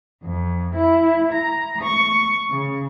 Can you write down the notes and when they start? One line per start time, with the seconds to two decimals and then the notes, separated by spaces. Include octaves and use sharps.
0.22 F2
0.74 E4
1.31 A#5
1.82 C#6
2.49 C#3